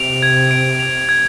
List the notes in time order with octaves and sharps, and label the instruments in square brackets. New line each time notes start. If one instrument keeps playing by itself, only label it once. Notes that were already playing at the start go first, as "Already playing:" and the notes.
Already playing: [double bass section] C3 [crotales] D7 F7
[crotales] G#6
D7
F7
G#6